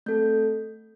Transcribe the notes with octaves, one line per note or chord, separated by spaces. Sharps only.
A3 C4 A4 G6